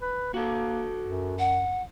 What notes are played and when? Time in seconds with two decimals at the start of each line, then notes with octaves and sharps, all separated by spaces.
0.02 B4
0.34 A#3 F#4 A4
1.02 F#2
1.39 F#5